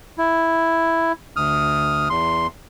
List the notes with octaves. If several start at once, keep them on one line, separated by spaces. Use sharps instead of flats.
E4
D2 D#6 F6
E2 C6